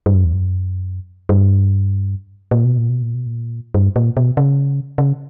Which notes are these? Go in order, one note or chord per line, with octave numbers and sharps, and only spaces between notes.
G2
F#2
E2
F#2
G2
A#2
B2
A#2
B2
A#2
B2
A#2
G2
A#2
B2
C#3
C#3